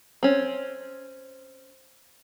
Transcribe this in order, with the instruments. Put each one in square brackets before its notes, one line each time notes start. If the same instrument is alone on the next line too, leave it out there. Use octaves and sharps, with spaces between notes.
[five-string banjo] C4 C#4